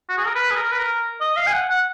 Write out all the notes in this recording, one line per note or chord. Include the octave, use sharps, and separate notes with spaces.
F#4
G#4
A#4
B4
G#4
A#4
B4
A#4
D#5
F5
G#5
F#5
F#5